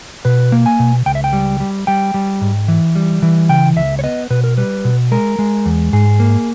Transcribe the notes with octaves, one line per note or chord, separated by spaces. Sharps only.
B2 B4
A#3
G#5
B2
C#2 G5
E5
G5
G3
G3
G3 G5
G3
G#2
E3
G3
E3
C#3 G5
C#2 E5
C#5
B3 D#5
B2 B4
A#4
G3 B4
B2
G#3 A#4
G#3
E2
G#2 G#4
A#3